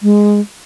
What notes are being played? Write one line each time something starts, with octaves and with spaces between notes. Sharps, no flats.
G#3